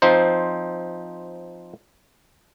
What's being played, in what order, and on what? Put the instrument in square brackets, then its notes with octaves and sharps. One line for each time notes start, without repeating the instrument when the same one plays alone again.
[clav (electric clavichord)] F3 C4 D#4 C5